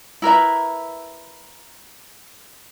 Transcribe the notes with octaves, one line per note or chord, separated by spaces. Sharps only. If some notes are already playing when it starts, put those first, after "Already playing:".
E4 A#4 B4 E5